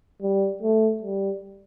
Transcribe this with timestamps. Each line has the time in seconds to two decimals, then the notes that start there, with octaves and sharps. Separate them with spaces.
0.22 G3
0.63 A3
1.03 G3